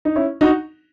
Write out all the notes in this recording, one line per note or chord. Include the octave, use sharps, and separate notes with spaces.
D#4
C#4 E4
D#4 F#4